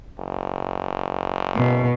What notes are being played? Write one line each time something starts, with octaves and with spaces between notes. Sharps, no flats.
F#1
B2